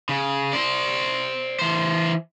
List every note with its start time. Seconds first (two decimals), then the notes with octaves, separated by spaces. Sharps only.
0.09 C#3
0.53 C5 D5
1.59 E3 C5